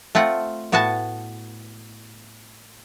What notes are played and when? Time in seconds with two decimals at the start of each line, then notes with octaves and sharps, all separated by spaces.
0.15 A3 C4 F4 F#5
0.72 A2 B3 F#4 G#5 A5